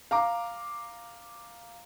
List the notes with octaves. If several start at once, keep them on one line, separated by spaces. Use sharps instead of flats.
F5 A#5 D6